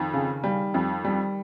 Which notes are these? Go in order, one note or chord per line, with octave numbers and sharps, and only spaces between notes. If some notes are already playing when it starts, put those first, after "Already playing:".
Already playing: F2 D#3
C#3
G3
F2
G3